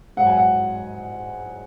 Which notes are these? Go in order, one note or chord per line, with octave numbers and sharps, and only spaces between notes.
G#2 F#3 F#5
G#5
F#5